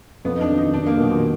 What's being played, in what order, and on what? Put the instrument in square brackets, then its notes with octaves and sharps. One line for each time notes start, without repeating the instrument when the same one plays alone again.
[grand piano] F2 [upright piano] B3
[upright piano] D#4
D4
[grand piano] D#3 F#3
[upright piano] D#4
[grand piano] F2 [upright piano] D4
[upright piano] A#3
[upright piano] B2 [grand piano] D#3 F#3
[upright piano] A#2